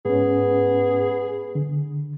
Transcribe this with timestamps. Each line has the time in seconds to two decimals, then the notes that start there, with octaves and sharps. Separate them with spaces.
0.05 G#2 B3 C#4 G#4
1.55 D3